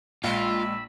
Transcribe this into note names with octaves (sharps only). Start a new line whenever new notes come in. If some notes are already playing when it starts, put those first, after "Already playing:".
A#1 G#3 F4 B5 E6